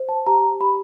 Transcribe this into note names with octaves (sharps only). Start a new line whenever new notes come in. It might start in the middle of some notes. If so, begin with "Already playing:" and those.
Already playing: C5
A5
G4 A#5
G4 B5